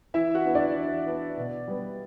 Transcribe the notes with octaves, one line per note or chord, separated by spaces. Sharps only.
E3 E4 E5
F#4 F#5
B3 D4
D4 D5
E3
B3 D4
B2
G3 B3